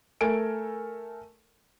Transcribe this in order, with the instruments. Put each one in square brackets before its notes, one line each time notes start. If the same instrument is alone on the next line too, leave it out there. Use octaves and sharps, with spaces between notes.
[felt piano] A3 A4 A#4 G#5 D7